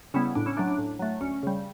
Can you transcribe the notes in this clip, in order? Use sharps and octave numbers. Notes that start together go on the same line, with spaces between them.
C#3 G3 B3 C#4 E4
A2 D4
C#4 E4
F#3 A3 D4
D4
A2
F#3 A3
D2 C#4
C#3 G3